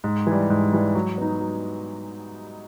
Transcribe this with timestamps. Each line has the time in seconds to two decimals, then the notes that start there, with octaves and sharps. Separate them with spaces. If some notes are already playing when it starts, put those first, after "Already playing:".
0.04 G#2
0.27 E3 G3
0.50 G#2
0.73 E3 G3
0.95 F#3
1.18 B3 D#4
1.40 F#3